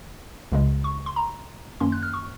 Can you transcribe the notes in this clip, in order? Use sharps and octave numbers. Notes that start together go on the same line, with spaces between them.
C#2 C#3 G#3
C#6
C6
A#5
F#2 D#3 A#3 C#4 C6
F#6
F6
C#6